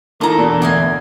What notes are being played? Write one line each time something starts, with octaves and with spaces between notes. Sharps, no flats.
E3 D#4 F4 A4 A#4 A#5 D6
E2 B2 D4 F#4
D2 A#3 D#5 E5 G#5